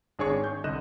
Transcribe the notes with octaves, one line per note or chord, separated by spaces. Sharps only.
G#1 D4 G#4 C#5 C#6
D4
G6
C2 D3 D#5 F#6 E7